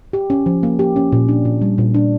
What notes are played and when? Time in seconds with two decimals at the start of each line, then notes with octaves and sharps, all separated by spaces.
0.13 G4
0.30 C#4
0.46 F3
0.63 A#3
0.79 G4
0.96 C#4
1.12 A#2
1.28 D4
1.45 A#2
1.62 G3
1.78 A#2
1.94 D4